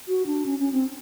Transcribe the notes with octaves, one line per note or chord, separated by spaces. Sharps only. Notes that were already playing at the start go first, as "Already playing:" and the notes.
F#4
D4
C#4
C#4
C4